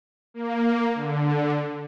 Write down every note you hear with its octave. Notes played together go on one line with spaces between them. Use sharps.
A#3
D3